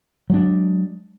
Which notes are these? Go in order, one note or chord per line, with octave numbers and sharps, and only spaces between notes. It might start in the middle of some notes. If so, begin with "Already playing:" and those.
F#3 G#3 D4